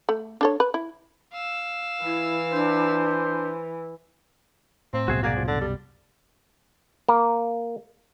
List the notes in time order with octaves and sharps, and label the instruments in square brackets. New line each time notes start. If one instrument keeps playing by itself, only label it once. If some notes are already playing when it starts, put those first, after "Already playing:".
[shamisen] A3
D4 A4 C#5
B4
E4
[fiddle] F5 E6
[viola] E3 [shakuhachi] E4
[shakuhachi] D4 [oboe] C5
[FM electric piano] A2 [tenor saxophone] C4
[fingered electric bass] C2 F#2 B2 [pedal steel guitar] F#4 G#4 E5
[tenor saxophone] A#3 [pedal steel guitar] F#4 G#4 D5
[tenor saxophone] F3
[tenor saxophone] D3 [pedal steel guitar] A4
[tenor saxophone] G3
[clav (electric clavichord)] A#3